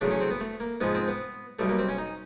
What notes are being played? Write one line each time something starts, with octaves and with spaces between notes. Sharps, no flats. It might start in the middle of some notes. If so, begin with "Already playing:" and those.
E2 C#3 F#3 A3 D4
C#4
C4
B3
A3
A#3
G#2 F3 G#3 B3
C4
B3
B1 B2 G3 A3
A#3
C4
C#4
D#4